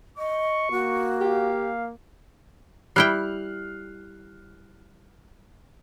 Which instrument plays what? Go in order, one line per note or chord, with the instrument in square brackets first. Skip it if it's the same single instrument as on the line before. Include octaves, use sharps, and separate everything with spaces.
[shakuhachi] D#5 [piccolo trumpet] C#6
[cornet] A#3 [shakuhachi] F#4
[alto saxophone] G4 [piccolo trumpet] F5
[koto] G3 E4 G5 [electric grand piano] F6 F#6 C7